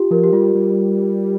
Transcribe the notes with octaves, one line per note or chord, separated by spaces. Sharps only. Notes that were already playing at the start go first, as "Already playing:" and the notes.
Already playing: F4 G4
F3 A#4
G4
G3 F4
G3